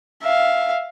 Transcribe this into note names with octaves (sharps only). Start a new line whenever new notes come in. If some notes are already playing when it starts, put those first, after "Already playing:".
E5 F5